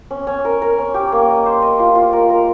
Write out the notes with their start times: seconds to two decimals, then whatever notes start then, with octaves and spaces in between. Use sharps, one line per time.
0.11 C#4
0.27 C#4
0.45 A#4
0.62 A#4
0.78 C#4
0.94 G4
1.12 A#3
1.29 D#5
1.46 C5
1.62 D#5
1.79 F4
1.95 F4
2.13 A#4
2.30 A#4